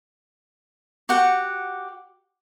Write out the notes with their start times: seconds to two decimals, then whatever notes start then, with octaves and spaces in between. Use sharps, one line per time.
1.09 F#4 G4 F#5